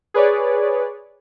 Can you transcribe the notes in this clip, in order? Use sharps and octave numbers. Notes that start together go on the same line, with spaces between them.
G#4 B4 C#5 D5